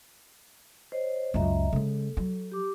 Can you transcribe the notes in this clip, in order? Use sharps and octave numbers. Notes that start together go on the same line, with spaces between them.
C5 C#5 D#5
C#2 F#2 D#5 E5 A#5
C#3 G#3 A4
F#3
G4 D6